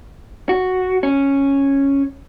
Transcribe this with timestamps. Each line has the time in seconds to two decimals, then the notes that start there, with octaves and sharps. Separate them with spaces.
0.49 F#4
1.03 C#4